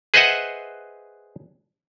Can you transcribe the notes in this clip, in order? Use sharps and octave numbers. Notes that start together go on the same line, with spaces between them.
G#4 B4 C5 D#5 E5 F#5